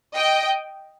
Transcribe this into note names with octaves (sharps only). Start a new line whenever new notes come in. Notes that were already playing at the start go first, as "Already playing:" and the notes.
D#5 G5